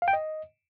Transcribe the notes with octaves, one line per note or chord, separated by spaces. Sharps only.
F5
G5
D#5